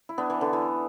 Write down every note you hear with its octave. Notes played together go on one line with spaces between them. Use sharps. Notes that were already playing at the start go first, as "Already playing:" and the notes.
E4
B3 D4
E3
D3
E3